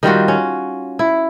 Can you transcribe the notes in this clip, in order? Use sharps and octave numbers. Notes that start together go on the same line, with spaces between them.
D#3 G3 F4 F#4
C#4
E4